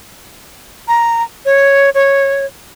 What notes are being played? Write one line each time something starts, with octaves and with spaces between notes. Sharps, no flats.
A#5
C#5
C#5